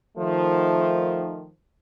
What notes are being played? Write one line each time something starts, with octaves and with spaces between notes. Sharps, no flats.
D#3 F3 A3